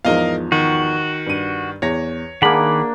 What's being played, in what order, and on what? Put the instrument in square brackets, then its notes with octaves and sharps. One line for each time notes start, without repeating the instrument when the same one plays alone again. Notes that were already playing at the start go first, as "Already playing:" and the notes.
[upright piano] E2 G#2 F3 [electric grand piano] A#4 D#5 F5
[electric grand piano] D#3 [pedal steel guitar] F#4
[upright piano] G2 D#7
[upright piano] E2 A#6 [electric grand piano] C#5
[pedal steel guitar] D#3 B5 [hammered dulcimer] A#3 D4 [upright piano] G#4 F#5